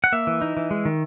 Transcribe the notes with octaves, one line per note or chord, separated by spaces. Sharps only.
F#5
A#3 E5
E3
D#4
E3
G#3
D#3